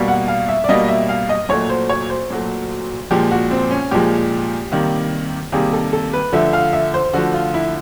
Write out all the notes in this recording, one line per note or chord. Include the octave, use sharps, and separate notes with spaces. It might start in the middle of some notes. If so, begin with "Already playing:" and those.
Already playing: B2 G3 A#3
F#5
F5
E5
D5
B2 G3 A#3 D#5
E5
F5
D#5
A#2 F#3 A3 C#5
C5
C#5
C5
A#2 F#3 A3
A#2 F3 G#3 G4
F#4
C4
C#4
A#2 F3 G#3 G4
C3 D#3 G3 A#3
C3 D#3 G3 A#3 G#4
A4
A4
B4
D3 F3 A3 E5
F5
E5
C5
D3 F3 A3 F#4
F4
E4